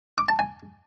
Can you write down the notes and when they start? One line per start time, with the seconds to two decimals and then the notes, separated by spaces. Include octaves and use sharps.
0.18 D6
0.28 A5
0.39 G#5